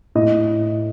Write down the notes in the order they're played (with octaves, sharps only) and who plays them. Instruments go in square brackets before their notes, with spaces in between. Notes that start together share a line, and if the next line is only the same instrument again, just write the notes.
[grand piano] A2 D#5